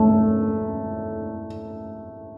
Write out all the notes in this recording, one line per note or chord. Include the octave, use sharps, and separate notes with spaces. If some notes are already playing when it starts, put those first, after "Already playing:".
Already playing: A3